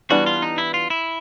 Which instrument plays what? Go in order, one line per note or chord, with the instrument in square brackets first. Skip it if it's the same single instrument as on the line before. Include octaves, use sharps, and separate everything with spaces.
[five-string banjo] E3 G3 B3 D4 [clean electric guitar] F#4
[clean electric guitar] F4
D#4
E4
F4
E4